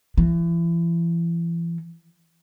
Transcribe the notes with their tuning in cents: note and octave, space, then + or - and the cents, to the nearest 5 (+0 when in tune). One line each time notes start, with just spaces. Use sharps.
E3 +35